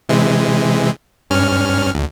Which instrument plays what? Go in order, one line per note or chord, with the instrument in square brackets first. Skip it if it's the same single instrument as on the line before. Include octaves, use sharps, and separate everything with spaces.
[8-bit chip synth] C3 E3 G#3
G2 C#4 F6
D2